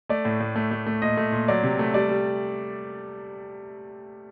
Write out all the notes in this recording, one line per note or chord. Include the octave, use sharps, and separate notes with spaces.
A3 D5
A2
A2
A3
A3
A3
A#2 D#5
A3
A#2
F#3 D5
C3
A3
G3 D5
G3